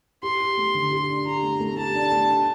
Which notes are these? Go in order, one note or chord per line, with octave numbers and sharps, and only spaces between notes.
G4 C6
G4
A3
D3
G4
D4
G4 A#5
A3
A3
G4 A5
D4
A3
D4